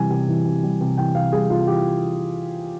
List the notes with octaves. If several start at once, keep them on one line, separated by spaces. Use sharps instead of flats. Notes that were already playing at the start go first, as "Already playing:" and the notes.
Already playing: C3 E3 G3 G#5
C3
E3
C3
G3
C3
E3 G5
C3 F5
G3 G#4
C3 F4
E3 G4